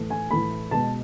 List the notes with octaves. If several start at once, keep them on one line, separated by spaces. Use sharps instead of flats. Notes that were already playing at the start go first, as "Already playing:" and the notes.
Already playing: A2 E3 A3
G#5
A2 E3 A3 B5
B2 G#3 B3 A5